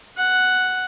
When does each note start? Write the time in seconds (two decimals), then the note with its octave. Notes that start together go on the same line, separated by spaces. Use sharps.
0.17 F#5